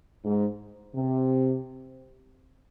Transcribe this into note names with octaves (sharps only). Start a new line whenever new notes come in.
G#2
C3